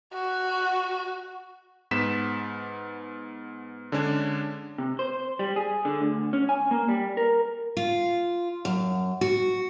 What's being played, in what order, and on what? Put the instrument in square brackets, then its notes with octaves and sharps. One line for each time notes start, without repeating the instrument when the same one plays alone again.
[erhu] F#4
[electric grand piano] G#2 B3 B6 E7
D3 G#3 C#4 D4
[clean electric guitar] C3
C5
G3
G#4
D3
D2
C#4
G#5
A#3
G3
A#4
[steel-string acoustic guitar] F4
F#2
F#4